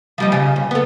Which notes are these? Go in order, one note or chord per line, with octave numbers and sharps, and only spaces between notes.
F3 G3 D#5
C#3
G2
B3 A4